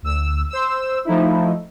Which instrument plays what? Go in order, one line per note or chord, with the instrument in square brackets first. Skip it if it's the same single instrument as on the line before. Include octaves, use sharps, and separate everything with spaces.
[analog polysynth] D2 E6
C5 E6
F3 A3 D#4 E4